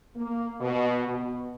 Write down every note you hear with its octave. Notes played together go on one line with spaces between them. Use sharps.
A#3
B2
B2